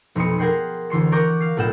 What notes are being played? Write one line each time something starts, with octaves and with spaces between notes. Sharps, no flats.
F1 B1 C6 D#6 C#7
G#4 A#4 F#5 G5 C6
D2 E3 C6 C#7
A#4 F#5 A#5 C#6 D6 G6
F5 C7
B1 A2 F4 F#5 G6 E7